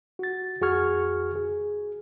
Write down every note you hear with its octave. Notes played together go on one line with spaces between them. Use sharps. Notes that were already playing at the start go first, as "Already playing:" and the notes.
F#4 A6
F2 F#4 G#4 C#6 F6 G#6
G#4